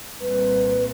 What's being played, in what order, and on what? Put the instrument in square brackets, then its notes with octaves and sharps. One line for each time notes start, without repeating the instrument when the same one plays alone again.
[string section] C2 A#2 [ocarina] B4